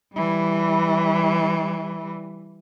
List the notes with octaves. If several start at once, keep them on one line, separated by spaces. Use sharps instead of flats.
E3 G3